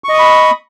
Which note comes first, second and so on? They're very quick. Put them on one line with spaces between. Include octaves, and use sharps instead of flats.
C#6 D#5 D#6 B5